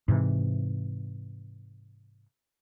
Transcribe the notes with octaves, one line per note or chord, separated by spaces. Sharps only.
G#2 C3 E3